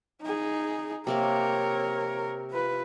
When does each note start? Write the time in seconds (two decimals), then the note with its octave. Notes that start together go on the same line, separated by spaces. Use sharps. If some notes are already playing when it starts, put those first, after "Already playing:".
0.22 D#4 G#4
1.07 C3 A#3 C4 A#4 C#5
2.51 F4 B4